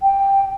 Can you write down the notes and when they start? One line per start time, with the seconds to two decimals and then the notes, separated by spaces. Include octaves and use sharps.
0.01 G5